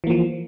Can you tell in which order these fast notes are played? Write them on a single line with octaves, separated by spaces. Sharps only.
E3 A#3 F3